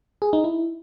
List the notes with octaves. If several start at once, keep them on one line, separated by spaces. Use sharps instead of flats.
G#4
D#4
E4